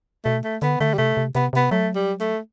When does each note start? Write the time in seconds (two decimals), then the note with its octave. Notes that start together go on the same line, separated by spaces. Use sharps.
0.25 B2 A3
0.44 A3
0.62 D3 B3
0.80 D3 A3
0.94 G3
0.98 C3 A3
1.17 C3
1.35 C3 B3
1.53 C3 B3
1.71 F#3 A3
1.95 G3
2.21 A3